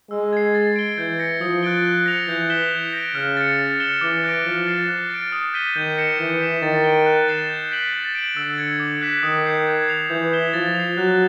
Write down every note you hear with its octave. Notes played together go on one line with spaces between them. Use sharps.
G#3 E6
G#6 C7
A6
D7 G7
E3 G6
A#6 C#7
F3 D#6
F#6 A6 D7 G7
F#6
A#6 C#7 F7
E3 G6
B6 E7 G7
G6
A#6 D7
C#3 F6
A6 C#7
A6
C#7 E7 G7
E3 D6
F#6 A#6 D7
F3 F6
A6 C7 E7
F#6
A6 D7
D#6
G6 B6 D#7 G7
D#3 G6
A#6 C#7 E7
E3 G6
B6 E7
D#3 A6
D7 G7
F#6
A6 C7 E7
G6
B6 D7 F#7
A6
D7 F#7
D3 E6
G#6 C#7
D6
F#6 B6 E7
D#3 D#6
G6 C7
G#6
C7 F7
E3 G6
B6 E7 G7
F3 A6
C7 F7
F#3 F#6